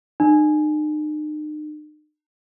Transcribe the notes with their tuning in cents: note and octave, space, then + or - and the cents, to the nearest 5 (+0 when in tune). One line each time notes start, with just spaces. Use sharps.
D#4 -40